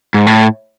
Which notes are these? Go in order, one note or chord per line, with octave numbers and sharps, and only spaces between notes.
G#2
A2